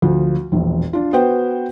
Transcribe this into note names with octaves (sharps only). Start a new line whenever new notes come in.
D2 F3
E1 A#1
D4 F4
B3 F#4 B4 C5 F#5 G5